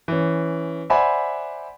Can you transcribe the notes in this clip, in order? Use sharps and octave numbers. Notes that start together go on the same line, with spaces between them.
E3 C#4
C5 D5 E5 F#5 G#5 B5